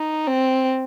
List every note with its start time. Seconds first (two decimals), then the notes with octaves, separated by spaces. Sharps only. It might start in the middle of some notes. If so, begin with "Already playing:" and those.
Already playing: D#4
0.27 C4